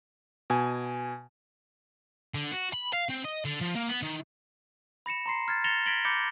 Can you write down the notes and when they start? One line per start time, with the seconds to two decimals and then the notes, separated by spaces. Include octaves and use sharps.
0.50 B2 G#5
2.35 D3
2.52 F#4
2.73 B5
2.93 F5
3.10 C4
3.25 D#5
3.45 D3
3.61 F3
3.75 A#3
3.89 B3
4.03 D#3
5.06 B5 A#6 C#7 E7
5.26 A#5 C6 C7
5.48 F6 G#6 A6
5.64 A6 A#6 C#7 E7 F7 G7
5.86 G#6 A#6 B6 D7 F#7 G7
6.05 B5 D6 G6 A#6 C#7 G7